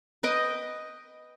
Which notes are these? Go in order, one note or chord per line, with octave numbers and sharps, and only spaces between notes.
B4 D#5 G5